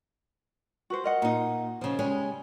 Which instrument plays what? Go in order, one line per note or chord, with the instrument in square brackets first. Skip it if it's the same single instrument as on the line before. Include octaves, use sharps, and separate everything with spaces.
[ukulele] F#4 B4 C5
A#4 D#5 F#5
[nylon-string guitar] A#2 D#4
C#3 F3
G3 G#3 C#4